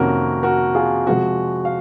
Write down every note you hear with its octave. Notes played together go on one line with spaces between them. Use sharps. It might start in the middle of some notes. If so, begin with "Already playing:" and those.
Already playing: F2 C3 D#3 A#3 C#4 F#4 A#4
F#4 A#4
F4 G#4
C3 F3 G#3 C4 F#4
F5